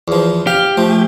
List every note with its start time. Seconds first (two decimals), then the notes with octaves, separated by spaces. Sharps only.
0.08 E2 F3
0.47 G4 F5
0.77 F3 A3